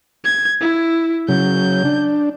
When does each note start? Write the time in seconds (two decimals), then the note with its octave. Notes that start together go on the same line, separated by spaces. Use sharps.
0.24 G#6
0.61 E4
1.28 C#3 F#3 G6
1.85 D4